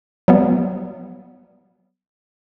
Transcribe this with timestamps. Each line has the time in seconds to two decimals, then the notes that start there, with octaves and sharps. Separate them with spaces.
0.28 F#3 G3 B3